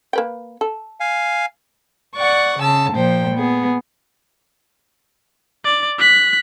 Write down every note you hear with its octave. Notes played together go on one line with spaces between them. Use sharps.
A#3 B4 G5
A4
F5 G#5
D5 F#5 C#6
C#3 A5 E6
A#2 F3 C5 G5
B3 G#4
D5
F#6 B6